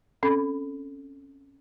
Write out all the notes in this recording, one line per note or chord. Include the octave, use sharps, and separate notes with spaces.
C4 C#4 A4 B5